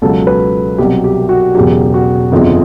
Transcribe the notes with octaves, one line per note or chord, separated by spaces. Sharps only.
C#2 B2 F#3 A4
B4
C2 B2 F#3 G4
G4
F#4
E1 E2 C#3 F#3 G4
F#4
G1 F2 C#3 F3